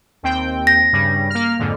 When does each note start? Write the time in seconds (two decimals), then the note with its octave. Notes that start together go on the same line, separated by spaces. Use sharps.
0.23 D#2 C4 G5
0.67 A#6
0.92 G2 C#3 G3
1.30 A#3 F6
1.59 F2 G#2 D3